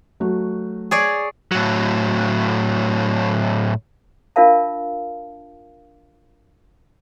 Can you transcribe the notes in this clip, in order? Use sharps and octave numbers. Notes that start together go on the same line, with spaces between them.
F#3 A3 F#4
G#4 C#5 D5
A2 F#3
D4 F4 A#4 E5 F5 A5